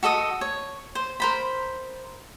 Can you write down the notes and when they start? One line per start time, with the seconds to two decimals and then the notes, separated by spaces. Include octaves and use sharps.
0.03 F#4 A4 D#5 D#6
0.41 C#5
0.95 C5
1.20 A#4 C5 B5